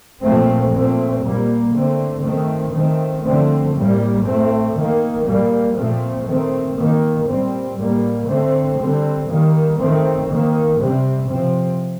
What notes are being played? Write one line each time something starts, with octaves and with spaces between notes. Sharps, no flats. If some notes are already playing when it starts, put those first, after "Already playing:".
A#2 F3 A3 C4
A#2 A3 C4
A#2 G3 A#3
D3 A3 C4
D#3 A3 C4
D#3 A3 C4
D3 F3 A3 C4
A2 G3 A#3
A2 A3 C4
D#3 A#3
A#2 G3 A#3
A#2 F3 A3 C4
D#3 A3 C4
D#3 A#3
A#2 G3 C4
A2 G3 A#3
D3 A3 C4
D3 G3 C4
D#3 G3 A#3
D#3 A3 C4
D#3 A#3
C3 G3 C4
C3 F3 C4